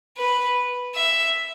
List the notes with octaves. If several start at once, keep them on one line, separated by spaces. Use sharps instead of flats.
B4
E5